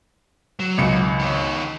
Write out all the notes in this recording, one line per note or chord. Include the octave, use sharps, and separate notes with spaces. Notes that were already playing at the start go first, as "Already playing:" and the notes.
F#3
G#1 C#2 C#7
D#3 C#5